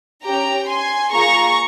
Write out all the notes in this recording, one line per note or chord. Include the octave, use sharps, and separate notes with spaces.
C#4 G4 G5 A#5
G#5 C6
A#3 F4 G#4 A#5 C#6